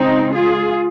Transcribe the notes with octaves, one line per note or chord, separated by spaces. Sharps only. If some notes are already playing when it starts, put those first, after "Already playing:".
Already playing: C#3 G#3 C4 D#4
F4 G#4